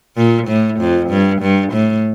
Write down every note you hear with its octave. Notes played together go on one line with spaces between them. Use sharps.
A#2
A2
F2
G2
G2
A2